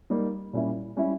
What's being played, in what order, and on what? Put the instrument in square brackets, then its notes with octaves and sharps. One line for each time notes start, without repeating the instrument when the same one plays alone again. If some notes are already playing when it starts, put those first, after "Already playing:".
[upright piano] G3 A#3 D#4
A#2 G3 C#4 E4
G3 C#4 E4